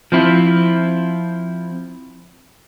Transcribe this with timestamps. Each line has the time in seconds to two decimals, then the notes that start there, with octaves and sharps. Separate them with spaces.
0.12 F3 C4 E4